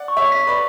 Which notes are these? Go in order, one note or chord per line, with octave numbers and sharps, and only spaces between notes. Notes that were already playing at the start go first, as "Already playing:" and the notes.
Already playing: D5 F#5
C#6
C#5 E5
B6
B4 D5